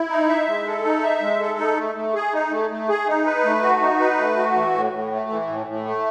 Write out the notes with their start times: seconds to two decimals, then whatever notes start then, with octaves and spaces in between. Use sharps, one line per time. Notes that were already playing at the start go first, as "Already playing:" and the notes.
Already playing: E4
0.10 D#4
0.29 E5
0.47 G#3
0.66 A4
0.84 D#4
1.03 E5
1.21 G#3
1.40 A4
1.59 D#4
1.77 A3
1.95 A3
2.14 G#4
2.33 D#4
2.51 A3
2.71 A3
2.89 G#4
3.07 D#4
3.26 B4
3.44 A3
3.63 F#4
3.81 D#4
4.00 B4
4.18 A3
4.37 F#4
4.55 E3
4.74 A2
4.92 A2
5.11 A3
5.30 E3
5.47 A2
5.66 A2
5.85 A3